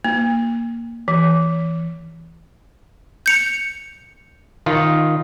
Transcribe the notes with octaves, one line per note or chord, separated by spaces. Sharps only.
A#3
E3
G6 C#7 F7
D#3 F4